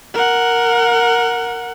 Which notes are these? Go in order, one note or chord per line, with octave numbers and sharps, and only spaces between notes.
A#4 F#5